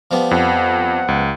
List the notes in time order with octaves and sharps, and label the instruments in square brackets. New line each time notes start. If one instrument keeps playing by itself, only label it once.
[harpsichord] F3 G3 B3
[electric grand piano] F2 [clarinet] F#5
[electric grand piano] C#2